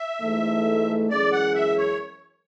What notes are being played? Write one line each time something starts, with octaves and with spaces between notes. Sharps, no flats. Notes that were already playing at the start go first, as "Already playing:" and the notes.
Already playing: E5
G#2 E3 A3
F#2 E3 G#3 C#4 G#4 D5
F#5
E5
C#5